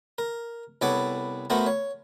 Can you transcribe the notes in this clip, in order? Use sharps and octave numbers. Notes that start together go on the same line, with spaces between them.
A#4
C2 B3 A4 C#5 F#5 D6
A3 B3 F#4 A#4 C5
C#5